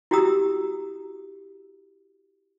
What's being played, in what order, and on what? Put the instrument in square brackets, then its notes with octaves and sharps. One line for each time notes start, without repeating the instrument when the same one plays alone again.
[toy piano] E4 F#4 G4 A#5 D#6 E6